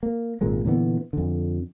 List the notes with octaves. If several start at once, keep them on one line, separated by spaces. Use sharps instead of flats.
A#3
G#1 A#2 G#3 A#3
A#2 D3 E3 B3
F2 D3